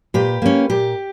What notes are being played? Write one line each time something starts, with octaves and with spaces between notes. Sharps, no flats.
A#2 G4 B4
A#3 C#4
A#2 G4